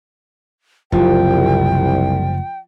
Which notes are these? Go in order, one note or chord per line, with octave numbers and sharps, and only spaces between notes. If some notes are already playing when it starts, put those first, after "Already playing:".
F#1 C2 F3 F#3 G5